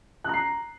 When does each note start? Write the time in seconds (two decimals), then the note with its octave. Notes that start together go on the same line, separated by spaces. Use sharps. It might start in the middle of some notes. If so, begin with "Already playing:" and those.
0.24 F#6
0.29 A#5
0.34 C7